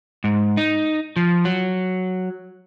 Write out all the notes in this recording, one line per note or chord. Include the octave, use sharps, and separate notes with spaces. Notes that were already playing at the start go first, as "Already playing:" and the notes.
G#2
D#4
F3
F#3